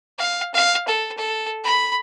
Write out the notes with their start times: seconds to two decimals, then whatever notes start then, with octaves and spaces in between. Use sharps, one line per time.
0.18 F5
0.54 F5
0.87 A4
1.17 A4
1.64 B5